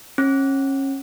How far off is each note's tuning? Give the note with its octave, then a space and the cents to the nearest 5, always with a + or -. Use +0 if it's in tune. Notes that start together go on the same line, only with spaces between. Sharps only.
C#4 -30